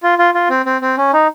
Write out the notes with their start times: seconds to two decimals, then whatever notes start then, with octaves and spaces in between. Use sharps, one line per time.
0.03 F4
0.19 F4
0.34 F4
0.50 C4
0.66 C4
0.81 C4
0.97 C#4
1.13 D#4